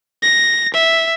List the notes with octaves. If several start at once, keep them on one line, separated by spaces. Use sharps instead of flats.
A#6
E5